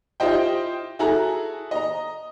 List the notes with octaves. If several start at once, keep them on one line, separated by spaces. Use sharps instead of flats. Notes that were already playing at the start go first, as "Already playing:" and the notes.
E4 F4 G4 C5 D#5 G5
E4 F#4 G#4 A4 A#5
D#5 A#5